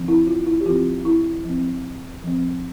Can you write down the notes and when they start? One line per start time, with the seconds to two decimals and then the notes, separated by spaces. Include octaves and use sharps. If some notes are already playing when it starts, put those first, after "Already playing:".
Already playing: F3 C4
0.08 E4
0.27 F4
0.46 E4
0.61 G4
0.66 F3 C4 F4
1.05 E4
1.45 F3 C4
2.24 F3 C4